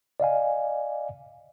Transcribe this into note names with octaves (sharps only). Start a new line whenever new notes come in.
D5 D#5 F5 G#5